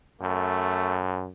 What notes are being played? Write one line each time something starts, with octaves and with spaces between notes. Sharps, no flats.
F#2 A3